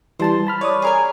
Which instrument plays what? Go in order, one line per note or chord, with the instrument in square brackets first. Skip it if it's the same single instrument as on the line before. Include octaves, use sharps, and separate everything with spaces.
[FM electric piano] E3 G3 A5 [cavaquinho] C5 C6
[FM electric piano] A5 B5 F6
[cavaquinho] B4 [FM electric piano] C#5 D5 D#6
[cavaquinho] G#4 A#4 G#5